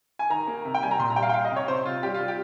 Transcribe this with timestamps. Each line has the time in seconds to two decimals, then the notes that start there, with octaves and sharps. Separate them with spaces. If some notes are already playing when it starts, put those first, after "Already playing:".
0.19 G#5
0.30 D#3 A#5
0.48 A#3
0.65 C3
0.74 G5
0.82 G3 G#5
0.91 A#5
0.99 A#2 C6
1.10 A#5
1.16 G3 G5
1.23 F5
1.29 G5
1.34 G3 F5
1.45 D#5
1.51 C3
1.56 C#5
1.68 C3 C5
1.85 C3 F4
2.03 G3 G4
2.14 G3 F4
2.28 G4